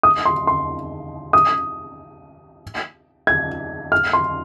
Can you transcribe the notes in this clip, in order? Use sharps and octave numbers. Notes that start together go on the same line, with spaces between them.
D#6
C6
C6
D#6
G#6
F6
C6